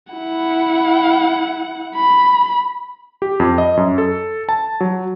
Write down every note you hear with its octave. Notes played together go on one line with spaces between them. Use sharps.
E4 F#5
B5
G4
F2
D#5
F#2
A4
A5
F#3